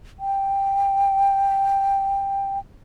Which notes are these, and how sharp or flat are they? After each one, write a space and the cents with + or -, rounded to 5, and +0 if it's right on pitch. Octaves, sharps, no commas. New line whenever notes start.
G5 +5